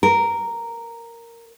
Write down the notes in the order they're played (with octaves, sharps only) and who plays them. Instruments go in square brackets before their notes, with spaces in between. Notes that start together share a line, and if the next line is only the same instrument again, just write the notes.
[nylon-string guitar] A#4